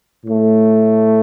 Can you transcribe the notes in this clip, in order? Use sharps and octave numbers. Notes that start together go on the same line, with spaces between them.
A2 A3